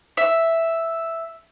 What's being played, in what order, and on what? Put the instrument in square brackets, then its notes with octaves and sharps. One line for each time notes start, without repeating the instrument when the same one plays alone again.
[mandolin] E5